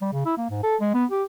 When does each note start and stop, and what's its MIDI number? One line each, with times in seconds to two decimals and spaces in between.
0.02 0.09 55
0.13 0.24 49
0.25 0.33 64
0.37 0.47 58
0.50 0.60 44
0.63 0.76 69
0.81 0.92 56
0.94 1.05 59
1.11 1.23 67